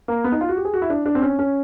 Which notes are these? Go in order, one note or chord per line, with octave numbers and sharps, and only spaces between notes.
A#3
B3
D#4
F4
F#4
G4
G#4
F#4
E4
D4
D4
C4
C#4
C#4